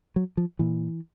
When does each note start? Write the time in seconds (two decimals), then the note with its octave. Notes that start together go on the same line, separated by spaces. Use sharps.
0.16 F#3
0.37 F3
0.59 A#2 E3